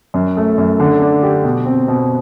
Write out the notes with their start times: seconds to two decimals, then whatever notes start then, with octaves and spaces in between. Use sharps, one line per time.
0.14 F#2
0.37 A3
0.58 F#2
0.80 D3
1.02 D4
1.23 G4
1.44 B2
1.65 C4
1.88 B2